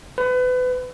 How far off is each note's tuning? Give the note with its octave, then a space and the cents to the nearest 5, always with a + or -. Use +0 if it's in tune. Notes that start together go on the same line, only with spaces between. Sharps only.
B4 +30